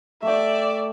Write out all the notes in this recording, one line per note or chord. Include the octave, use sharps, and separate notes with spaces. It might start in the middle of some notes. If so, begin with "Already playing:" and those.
A3 D5 E5 G5